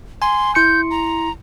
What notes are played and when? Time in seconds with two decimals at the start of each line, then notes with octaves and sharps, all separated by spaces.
0.22 G#5 C6
0.55 E4 C6 G6 C#7
0.91 A#5